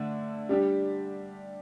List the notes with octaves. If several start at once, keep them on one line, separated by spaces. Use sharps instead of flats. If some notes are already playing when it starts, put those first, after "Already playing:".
Already playing: D3 A3 D4
G3 D4 G4